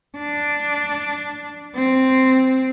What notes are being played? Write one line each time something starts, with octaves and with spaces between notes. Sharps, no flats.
D4
C4